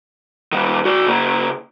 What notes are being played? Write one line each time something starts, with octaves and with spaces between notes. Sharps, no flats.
D#3 G3
F#4 D5
C#3 A#3